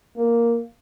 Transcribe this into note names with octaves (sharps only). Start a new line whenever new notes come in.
A#3